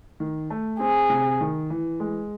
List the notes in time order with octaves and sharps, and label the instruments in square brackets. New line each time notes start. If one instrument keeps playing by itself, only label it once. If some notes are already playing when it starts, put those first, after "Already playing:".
[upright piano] D#3
A3
[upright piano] C4 [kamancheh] G#4
[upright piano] C3
D#3
E3
G#3